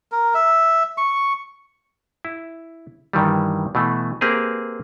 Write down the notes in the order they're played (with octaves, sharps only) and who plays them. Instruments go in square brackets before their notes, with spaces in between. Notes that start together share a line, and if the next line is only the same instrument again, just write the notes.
[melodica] A#4
E5
C#6
[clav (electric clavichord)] E4
G2 D#3 E3 G3
B2 E3 A3
A#3 C4 G4 G#4 B4